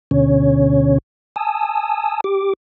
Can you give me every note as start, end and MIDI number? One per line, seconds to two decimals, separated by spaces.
0.11 0.98 38
0.11 0.98 47
0.11 0.98 50
0.11 0.98 61
0.11 0.98 73
1.36 2.21 80
1.36 2.21 81
1.36 2.21 87
1.36 2.21 88
2.24 2.53 67
2.24 2.53 86